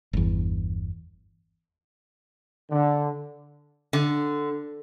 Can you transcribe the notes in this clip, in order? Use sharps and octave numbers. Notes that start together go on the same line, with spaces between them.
G1 E2
D3
D3